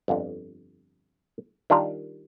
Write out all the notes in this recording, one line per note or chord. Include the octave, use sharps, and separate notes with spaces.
G1 F2 D3
D#3 G3 D4 F4 A#4